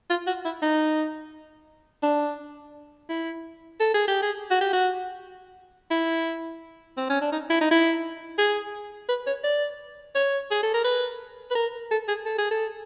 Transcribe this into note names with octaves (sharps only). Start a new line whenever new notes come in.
F4
F#4
E4
D#4
D4
E4
A4
G#4
G4
G#4
F#4
G4
F#4
E4
C4
C#4
D4
D#4
E4
D#4
E4
G#4
B4
C#5
D5
C#5
G#4
A4
A#4
B4
B4
A#4
A4
G#4
A4
G#4
A4